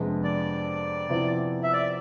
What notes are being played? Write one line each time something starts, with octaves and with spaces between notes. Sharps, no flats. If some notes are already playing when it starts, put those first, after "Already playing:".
Already playing: F2 C3 G#3 B3 D4
D5
C3 F3 B3 E4
E5
D5